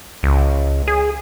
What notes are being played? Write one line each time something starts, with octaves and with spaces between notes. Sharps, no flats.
C#2
G#4